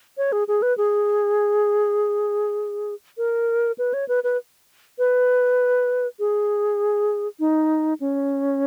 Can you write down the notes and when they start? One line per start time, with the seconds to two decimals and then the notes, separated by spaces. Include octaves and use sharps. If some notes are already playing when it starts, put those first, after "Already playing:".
0.17 C#5
0.32 G#4
0.48 G#4
0.62 B4
0.78 G#4
3.18 A#4
3.78 B4
3.94 C#5
4.08 B4
4.24 B4
4.99 B4
6.19 G#4
7.40 D#4
8.00 C#4